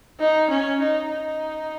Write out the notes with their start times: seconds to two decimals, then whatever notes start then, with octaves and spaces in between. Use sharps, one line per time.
0.20 D#4
0.50 C#4
0.80 D#4
1.11 D#4